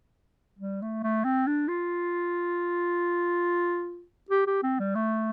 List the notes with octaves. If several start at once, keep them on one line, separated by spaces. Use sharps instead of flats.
G3
A3
A3
C4
D4
F4
G4
G4
C4
G3
A3